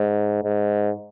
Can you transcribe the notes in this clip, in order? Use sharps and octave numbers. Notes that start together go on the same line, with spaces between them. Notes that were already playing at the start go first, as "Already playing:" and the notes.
Already playing: G#2
G#2